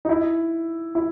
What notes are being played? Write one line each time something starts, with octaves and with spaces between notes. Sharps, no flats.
D#4
E4
E4